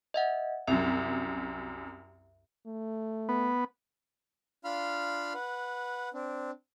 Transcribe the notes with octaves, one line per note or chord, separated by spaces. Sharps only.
D#5 E5 F#5
C2 F#2 E5
A3
B3
D4 F4 F5 B5 C6 F6
B4 F#5
C4 D4